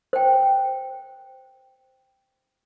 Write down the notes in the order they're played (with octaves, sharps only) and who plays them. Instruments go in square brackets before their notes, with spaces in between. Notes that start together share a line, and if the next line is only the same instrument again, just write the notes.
[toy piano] C5 G5